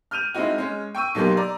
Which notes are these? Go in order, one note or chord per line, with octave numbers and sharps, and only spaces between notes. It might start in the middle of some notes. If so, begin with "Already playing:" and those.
F6 G6 D#7 F7
G#3 C4 D#4 E4 F#4
G#3 C#4
G5 C#6 E6 D#7
B1 B2 F#3 A#3 G4 C6
D5 A#5 D6